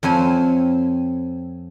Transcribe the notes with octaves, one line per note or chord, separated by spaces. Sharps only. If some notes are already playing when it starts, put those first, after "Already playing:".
F2 C4 C#5 G#5